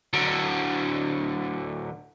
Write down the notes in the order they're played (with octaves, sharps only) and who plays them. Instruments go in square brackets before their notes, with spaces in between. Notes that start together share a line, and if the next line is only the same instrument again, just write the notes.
[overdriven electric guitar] D3 F#3